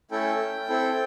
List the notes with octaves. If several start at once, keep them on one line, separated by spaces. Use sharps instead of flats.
A3 C#4 E4 A4 G5
C4 E4 A4